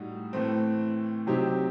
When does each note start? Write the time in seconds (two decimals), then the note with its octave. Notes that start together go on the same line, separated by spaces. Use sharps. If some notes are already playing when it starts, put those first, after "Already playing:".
Already playing: A2 G3 D#4 F#4
0.33 A2 E3 A3 C4
1.27 C3 F#3 C4 D#4 G4